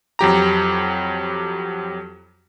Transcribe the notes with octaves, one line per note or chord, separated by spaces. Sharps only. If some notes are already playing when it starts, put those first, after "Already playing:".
F2 F#3 G4 A#5